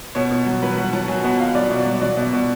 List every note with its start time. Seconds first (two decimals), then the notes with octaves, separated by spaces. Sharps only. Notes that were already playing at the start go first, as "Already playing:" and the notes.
0.15 B2 C#5
0.31 B2
0.46 F#3
0.62 F#3 B4
0.77 F#3 F#5
0.93 F#3 A5
1.08 F#3 G#5
1.23 B2 F#5
1.39 B2 F5
1.55 F#3 D5
1.71 B2
1.79 D5
1.87 F#3
2.02 F#3 D5
2.17 B2
2.33 B2